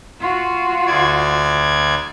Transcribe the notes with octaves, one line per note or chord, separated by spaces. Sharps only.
F4 F#4
D2 D5 G#6